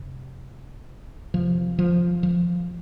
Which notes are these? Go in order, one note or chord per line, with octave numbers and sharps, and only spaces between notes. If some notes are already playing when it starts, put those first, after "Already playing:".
Already playing: F2 C3
F2 C3 F3
F3
F3